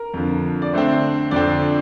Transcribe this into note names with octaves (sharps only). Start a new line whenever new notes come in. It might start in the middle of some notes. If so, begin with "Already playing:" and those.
Already playing: A#4
F2 D3 F3
D5
D3 A3 C4 C5
F2 D3 F3 C4 D5